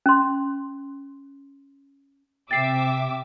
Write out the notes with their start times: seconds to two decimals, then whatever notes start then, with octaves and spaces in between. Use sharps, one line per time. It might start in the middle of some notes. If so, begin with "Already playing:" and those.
0.06 C#4 C6
2.51 C3 E5 G5 D6 A6 C7